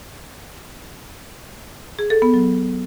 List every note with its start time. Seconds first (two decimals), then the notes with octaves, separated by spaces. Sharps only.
1.99 G#4
2.10 A4
2.22 B3
2.34 F#3